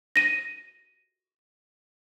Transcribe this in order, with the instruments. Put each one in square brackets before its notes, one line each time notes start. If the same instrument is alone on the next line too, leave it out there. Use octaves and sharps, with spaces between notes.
[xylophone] A#6 D#7